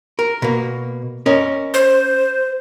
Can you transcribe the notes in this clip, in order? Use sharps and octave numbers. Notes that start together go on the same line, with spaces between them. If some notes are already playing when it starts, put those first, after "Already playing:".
A#4
B2 A#3
C#4 A#4 D#5
C5